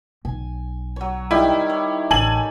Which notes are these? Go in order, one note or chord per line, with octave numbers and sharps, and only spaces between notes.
B1 G#5
F#3 C#5
D#3 G3 E4 G4
C#5
A1 A4 G#5 F#7